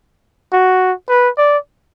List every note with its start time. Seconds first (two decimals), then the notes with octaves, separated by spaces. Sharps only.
0.52 F#4
1.09 B4
1.38 D5